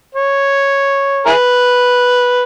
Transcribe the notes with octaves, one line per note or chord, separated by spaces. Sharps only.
C#5
E4 G#4 B4